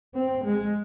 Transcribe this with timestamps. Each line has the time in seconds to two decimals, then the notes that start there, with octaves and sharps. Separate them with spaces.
0.14 C4
0.44 G#3